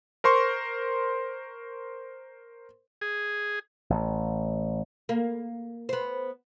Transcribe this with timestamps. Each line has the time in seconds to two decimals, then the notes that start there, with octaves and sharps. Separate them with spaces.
0.24 A#4 C5 C6 C#6
3.01 G#4
3.90 A1
5.09 A#3
5.89 B3 C5